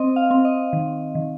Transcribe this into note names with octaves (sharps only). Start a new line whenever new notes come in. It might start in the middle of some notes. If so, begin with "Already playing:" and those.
Already playing: C4 D#5
F5
C4
D#5
D#3
D#3